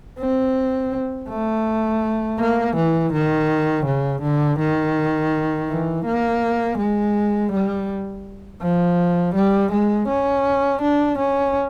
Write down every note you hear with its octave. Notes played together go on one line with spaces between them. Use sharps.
C4
A3
A#3
E3
D#3
C#3
D3
D#3
E3
A#3
G#3
G3
F3
G3
G#3
C#4
D4
C#4